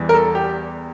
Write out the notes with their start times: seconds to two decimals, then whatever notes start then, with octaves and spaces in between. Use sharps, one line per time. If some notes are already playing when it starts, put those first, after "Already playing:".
Already playing: E2 E3 G3
0.09 A#4
0.14 A4
0.35 G4